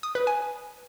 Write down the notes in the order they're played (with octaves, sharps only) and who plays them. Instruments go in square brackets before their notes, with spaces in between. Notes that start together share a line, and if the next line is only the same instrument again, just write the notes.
[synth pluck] D#6
B4
G#5